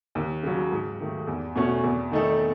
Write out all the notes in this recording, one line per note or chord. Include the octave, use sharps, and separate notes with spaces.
D#2
C#3 F#3
G#2
D#3 A3
E2
B2 A3 C#4 F#4
E2
D#3 A3 D#4 A4